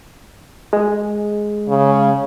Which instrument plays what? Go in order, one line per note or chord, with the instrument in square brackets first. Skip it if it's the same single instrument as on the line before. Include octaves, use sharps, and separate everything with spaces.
[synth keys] G#3
[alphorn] C#3